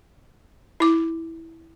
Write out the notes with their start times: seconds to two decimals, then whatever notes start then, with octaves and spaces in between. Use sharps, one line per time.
0.80 E4 D6